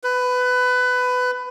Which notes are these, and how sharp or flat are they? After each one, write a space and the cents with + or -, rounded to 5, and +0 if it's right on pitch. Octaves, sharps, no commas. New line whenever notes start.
B4 +20